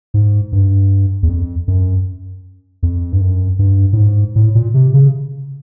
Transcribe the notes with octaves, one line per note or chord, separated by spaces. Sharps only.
G#2
G2
E2
F2
F#2
F2
G2
F#2
G2
A2
G#2
A2
A#2
C3
C#3